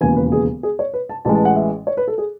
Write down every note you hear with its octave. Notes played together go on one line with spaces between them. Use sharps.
E1 D#2 C#3 E3 G#5
B4
G#4
G#4
C#5
B4
A5
A1 A2 E3 G#3 A5
A5
F#5
E5
C#5
B4
A4
G#4